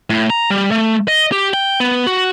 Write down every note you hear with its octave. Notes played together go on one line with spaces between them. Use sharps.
A2
A#5
G3
A3
D#5
G4
G5
B3
F#4